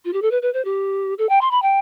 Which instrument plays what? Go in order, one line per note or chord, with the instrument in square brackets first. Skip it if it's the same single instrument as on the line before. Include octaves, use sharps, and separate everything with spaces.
[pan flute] F4
G4
A4
B4
B4
C5
G4
A4
G5
C6
B5
G5